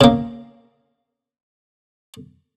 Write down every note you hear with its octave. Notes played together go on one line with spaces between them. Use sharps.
C#3 A#3